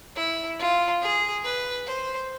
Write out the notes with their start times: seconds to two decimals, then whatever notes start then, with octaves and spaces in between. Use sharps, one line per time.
0.16 E4
0.59 F4
1.02 G#4
1.44 B4
1.87 C5